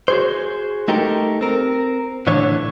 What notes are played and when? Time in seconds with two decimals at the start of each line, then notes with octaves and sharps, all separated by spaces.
0.08 F#4 G#4 C5
0.88 A3 D#4 G4 A4 A#4
1.41 C4 A#4
2.27 A2 D3 E3 D4 C#5